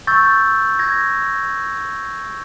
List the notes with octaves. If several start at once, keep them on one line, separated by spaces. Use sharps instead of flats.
C#6 E6 G6 A6
G#6 A#6